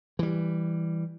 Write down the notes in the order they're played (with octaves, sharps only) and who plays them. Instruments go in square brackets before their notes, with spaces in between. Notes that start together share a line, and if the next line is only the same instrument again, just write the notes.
[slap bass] E3 G3